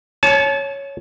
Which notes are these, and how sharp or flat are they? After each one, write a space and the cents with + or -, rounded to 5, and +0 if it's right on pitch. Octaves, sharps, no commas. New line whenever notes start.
C#5 +0 A5 -35